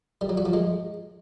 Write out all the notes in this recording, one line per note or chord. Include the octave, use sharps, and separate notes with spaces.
G3
F#3
F#4
F3
G#3